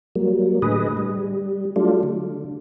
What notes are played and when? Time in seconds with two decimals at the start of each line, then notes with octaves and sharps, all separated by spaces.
0.15 F#3 G3 A#3
0.62 A2 D3 G#4 B4 D#5
0.97 G3
1.76 F#3 G3 A3 D4 F4
2.03 D3